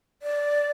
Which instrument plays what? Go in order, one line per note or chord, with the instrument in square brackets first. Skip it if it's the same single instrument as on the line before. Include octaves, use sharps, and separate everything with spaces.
[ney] D5